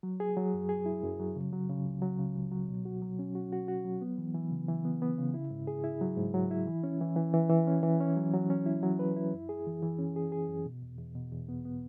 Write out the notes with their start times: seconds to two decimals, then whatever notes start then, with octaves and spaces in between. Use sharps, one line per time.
0.03 F#3
0.20 G#4
0.37 F#3
0.54 F#2
0.69 G#4
0.86 E4
1.03 F#2
1.19 F#3
1.35 C#3
1.53 F#3
1.69 C#3
1.85 C#2
2.02 F#3
2.19 C#3
2.35 C#2
2.52 F#3
2.69 B2
2.85 F#4
3.02 F#3
3.19 C#4
3.35 F#4
3.52 F#4
3.68 F#4
3.85 F#3
4.01 B3
4.18 E3
4.34 E3
4.51 C#3
4.68 E3
4.85 B3
5.02 B3
5.18 C#3
5.34 E4
5.51 G#2
5.67 G#4
5.84 E4
6.01 F#3
6.17 G#2
6.34 F#3
6.51 E4
6.67 E3
6.84 C#4
7.01 E3
7.16 E3
7.34 E3
7.50 E3
7.67 C#4
7.83 E3
8.01 C#4
8.17 F#3
8.33 F#3
8.50 C#4
8.66 E4
8.83 F#3
8.99 B4
9.16 E4
9.33 F#2
9.49 G#4
9.67 E3
9.82 E3
9.99 C#4
10.16 G#4
10.32 G#4
10.48 F#2
10.66 B2
10.82 E2
10.98 E2
11.15 B2
11.32 E2
11.49 B3
11.65 B3